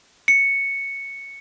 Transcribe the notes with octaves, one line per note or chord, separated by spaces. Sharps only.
C#7